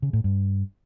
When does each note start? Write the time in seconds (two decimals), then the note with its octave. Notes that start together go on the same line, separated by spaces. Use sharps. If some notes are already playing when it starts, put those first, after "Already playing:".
0.02 C#3
0.13 A2
0.24 G2